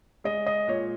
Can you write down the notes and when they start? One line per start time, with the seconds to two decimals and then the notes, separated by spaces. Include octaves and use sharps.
0.24 G#3 D#5
0.46 D#5
0.68 A#2 C#5